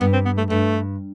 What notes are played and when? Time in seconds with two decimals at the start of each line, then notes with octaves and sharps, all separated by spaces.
0.01 G2 B3
0.13 C4
0.26 B3
0.38 A3
0.50 G2 A3